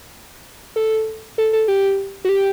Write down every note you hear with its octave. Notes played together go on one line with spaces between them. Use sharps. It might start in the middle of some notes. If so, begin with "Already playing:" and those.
A4
A4
A4
G4
F#4
G4